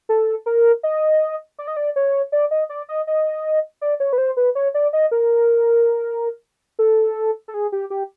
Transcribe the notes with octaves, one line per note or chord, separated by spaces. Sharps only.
A4
A#4
D#5
D5
D#5
D5
C#5
D5
D#5
D5
D#5
D#5
D5
C#5
B4
C5
B4
C#5
D5
D#5
A#4
A4
A4
G#4
G4
G4